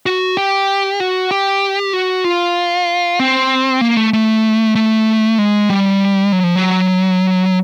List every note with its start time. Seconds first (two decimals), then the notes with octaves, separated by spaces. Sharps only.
0.06 F#4
0.37 G4
1.00 F#4
1.31 G4
1.93 F#4
2.24 F4
3.19 C4
3.81 A#3
3.97 A3
4.13 A3
4.75 A3
5.38 G#3
5.70 G3
6.32 F#3
6.43 F3
6.55 F#3